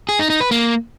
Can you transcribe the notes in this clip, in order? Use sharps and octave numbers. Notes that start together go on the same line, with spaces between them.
G#4
D#4
D#4
B4
A#3